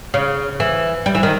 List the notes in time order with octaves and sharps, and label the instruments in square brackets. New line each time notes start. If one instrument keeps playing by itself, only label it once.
[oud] C#3
E3
G3
E3
D#3